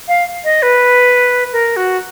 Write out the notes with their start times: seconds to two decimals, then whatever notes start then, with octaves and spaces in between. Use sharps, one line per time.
0.08 F5
0.44 D#5
0.63 B4
1.53 A#4
1.76 F#4